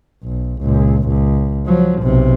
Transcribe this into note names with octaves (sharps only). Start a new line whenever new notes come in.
B1
C#2 A#2
C#2
F3 F#3
B1 C3